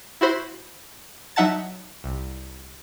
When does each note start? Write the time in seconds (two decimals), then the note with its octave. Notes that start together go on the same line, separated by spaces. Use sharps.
0.21 E4 F#4 C5 B5
1.36 F#3 D#4 E5 F#5 A5 A6
2.04 C2